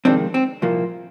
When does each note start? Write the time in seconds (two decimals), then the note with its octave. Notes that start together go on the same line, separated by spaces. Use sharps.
0.05 F2 C3 D#3 G#3 C4 D4
0.34 C4
0.62 C2 A#2 F3 A#3